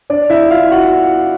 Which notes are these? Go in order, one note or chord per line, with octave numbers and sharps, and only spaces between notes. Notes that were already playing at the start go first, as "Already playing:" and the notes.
D4 D5
E4 E5
F4 F5
F#4 F#5